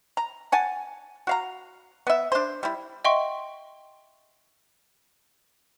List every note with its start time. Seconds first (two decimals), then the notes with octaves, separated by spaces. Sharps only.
0.17 A#5
0.52 F#5 G#5 A5
1.27 F#4 F5 A#5
2.07 B3 E5
2.32 D4 C5
2.63 G3 E4
3.05 D#5 E5 F#5 G5 C6 C#6